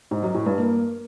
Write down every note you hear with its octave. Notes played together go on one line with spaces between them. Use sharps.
G#2
F#2
A2
G2
A#3